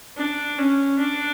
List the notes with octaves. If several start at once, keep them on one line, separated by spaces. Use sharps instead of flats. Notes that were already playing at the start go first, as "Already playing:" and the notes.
D4
C#4
D4